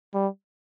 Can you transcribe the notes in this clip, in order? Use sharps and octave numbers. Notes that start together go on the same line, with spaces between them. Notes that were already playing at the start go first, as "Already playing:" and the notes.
G3